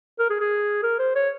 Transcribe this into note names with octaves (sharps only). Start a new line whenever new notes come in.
A#4
G#4
G#4
A#4
C5
C#5